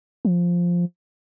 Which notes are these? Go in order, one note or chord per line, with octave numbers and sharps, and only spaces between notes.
F3